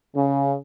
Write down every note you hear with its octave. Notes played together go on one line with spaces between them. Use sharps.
C#3